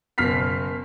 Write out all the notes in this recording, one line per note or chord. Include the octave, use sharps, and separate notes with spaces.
F#1 B2 F6 B6 C7